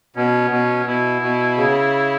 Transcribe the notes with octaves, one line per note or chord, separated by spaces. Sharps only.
B2 C#4
B2
B2 E4
B2
C#3